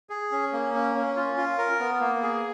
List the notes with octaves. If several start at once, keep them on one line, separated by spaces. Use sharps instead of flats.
G#4
C#4
A#3
C#4
C#4
F4
F4
A#4
B3
A#3
G#4